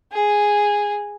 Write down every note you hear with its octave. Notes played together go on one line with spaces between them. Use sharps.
G#4